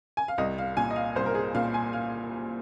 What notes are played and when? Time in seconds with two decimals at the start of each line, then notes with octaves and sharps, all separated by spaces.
0.17 G#5
0.28 F5
0.38 C2 D#5
0.58 F5
0.77 A#2 G#5
0.91 D#5
0.96 F5
1.15 C2 C5
1.26 A#4
1.35 G#4
1.55 A#2 F5
1.74 G#5
1.93 F5